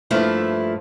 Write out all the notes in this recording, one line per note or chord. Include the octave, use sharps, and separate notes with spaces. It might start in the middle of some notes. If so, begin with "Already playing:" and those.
G2 F3 A3 A#3 E4